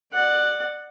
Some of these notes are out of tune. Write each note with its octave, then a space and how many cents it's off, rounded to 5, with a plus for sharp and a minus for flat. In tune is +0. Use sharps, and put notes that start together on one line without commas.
D5 +25 F#5 +0